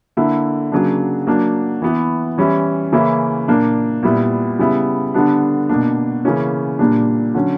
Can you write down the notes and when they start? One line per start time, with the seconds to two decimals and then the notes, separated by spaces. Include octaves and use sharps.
0.17 D3 A#3 E4
0.72 C#3 F#3 A#3 D4
1.27 F#3 A#3 D4
1.82 E3 B3 E4
2.38 E3 G3 C#4 E4
2.92 C#3 E3 A#3 C#4 E4
3.48 A#2 A#3 D4
4.03 A#2 G3 B3 E4
4.59 C#3 G3 B3 E4
5.14 D3 G3 B3 D4
5.69 B2 A#3 D4
6.25 C#3 E3 A#3 C#4
6.79 A#2 G3 A#3 D4
7.35 D3 F#3 C#4